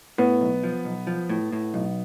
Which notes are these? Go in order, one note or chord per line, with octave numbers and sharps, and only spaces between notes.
A2 B3
B1
F3
B1
F3
A2
A2
B1